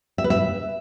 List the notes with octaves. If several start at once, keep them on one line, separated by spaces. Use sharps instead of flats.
E5
B4
E5